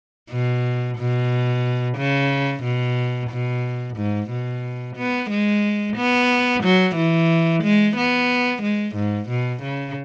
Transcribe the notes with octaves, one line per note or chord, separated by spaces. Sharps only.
B2
B2
C#3
B2
B2
G#2
B2
B3
G#3
B3
F#3
E3
G#3
B3
G#3
G#2
B2
C#3